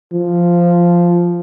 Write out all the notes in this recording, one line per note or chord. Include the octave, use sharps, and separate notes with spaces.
F3